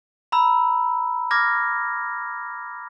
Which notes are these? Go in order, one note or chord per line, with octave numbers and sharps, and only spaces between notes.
A#5 B5 E6
D6 F6 G#6 A#6